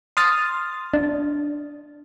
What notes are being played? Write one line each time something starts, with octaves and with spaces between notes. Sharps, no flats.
C6 D#6 F6 A6
D4